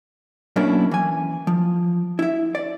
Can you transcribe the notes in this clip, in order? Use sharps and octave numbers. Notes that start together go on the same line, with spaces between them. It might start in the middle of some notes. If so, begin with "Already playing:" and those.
F#2 B2 A#3 C#4 D4 E4
E3 G#5
F3
E4 E5
D5